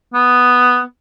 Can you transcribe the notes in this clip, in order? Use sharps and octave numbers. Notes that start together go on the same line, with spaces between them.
B3